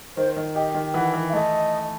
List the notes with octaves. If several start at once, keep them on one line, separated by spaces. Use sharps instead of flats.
D#3 C5
D#3
G4 D#5
D#3
E3 F#5
E3
E5
A3 D#5